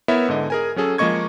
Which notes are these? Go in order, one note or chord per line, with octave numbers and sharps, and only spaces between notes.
B3 E4 A#4 C#5 E5
G#2 D3 D#5
G#4 A#4 G#5
F#3 C#4 G#4 A4
F3 G#3 A#3 D#5 C#6 G#6